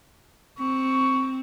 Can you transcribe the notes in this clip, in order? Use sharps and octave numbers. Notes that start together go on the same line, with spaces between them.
C4 C#6